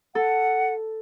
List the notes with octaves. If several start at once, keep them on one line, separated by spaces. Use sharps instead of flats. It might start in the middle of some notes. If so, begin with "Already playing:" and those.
A4 F#5